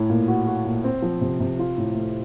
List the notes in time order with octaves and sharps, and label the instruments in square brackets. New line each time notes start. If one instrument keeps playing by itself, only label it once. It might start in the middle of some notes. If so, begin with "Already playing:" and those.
Already playing: [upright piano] A2
A#2
F#4
F#4
A#2
C4
F3
C3
C3
F4
A2
A3